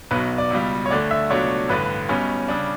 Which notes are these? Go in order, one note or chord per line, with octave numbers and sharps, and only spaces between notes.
B1 B2 F#3 B4
D5
C#2 B2 G3
C#5
D2 D3 A3 D5
E5
C#2 B2 F#3 A3 D4 C#5
A1 G2 D3 B4
B1 B2 G3 C#4
C#3 G3 D4